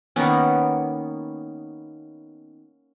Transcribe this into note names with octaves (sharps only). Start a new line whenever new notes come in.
D#3 A#3 B3 C#4